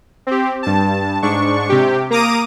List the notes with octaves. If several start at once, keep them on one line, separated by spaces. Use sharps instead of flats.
C4 G4
G2 A5
G#2 D4 C#6
C3 G4
A#3 A#5 D6 D#6 D#7